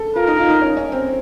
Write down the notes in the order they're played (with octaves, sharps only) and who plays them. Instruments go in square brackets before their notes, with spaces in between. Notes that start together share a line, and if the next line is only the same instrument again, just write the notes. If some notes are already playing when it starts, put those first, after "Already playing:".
Already playing: [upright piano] A4
[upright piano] F4 [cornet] A#4
[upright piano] D#4
F4
D#4
C#4
C#4
C4